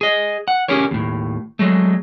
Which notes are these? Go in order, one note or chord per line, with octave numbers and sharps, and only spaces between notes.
G#4 D#5
F#5
C#4 G4 G#4 A#4 C#5
D#2 A2
F#3 G#3 A3